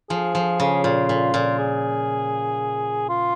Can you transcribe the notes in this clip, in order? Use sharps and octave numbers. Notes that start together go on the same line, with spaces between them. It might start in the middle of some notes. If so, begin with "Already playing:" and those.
F3 G#4
F3
C#3
A#2 F4
A#2
A#2
G#4
F4